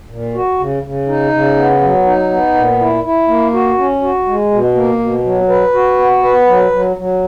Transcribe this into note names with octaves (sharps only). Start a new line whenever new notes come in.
A#2
F#4
C#3
C#3
D#4
C#3
B3
F#3
D#4
B3
A#2
E4
E4
A#3
F#4
C#4
F#4
G#3
B2
A#3
B2
F#3
B4
F#4
B3
B4
F#3
F#3
F#3